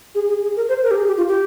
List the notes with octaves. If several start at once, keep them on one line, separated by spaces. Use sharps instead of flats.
G#4
G#4
G#4
A#4
C5
A#4
G4
G#4
G4
F4
G4